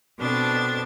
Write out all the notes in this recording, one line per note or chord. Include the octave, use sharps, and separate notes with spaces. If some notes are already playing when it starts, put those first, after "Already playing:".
B2 C4 D4 A4 A6